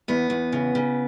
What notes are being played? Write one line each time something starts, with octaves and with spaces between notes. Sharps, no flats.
E2 B3
E2
C#3
C#3